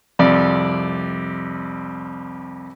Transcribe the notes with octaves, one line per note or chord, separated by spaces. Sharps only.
C2 F2 D5